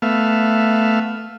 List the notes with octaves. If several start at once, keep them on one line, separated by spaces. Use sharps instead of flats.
A3 B3 E5 F5